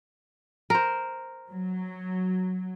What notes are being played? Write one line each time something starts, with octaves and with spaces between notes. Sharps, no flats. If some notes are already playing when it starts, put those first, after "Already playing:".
A#4 C5
F#3